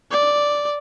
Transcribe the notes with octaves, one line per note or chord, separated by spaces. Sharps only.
D5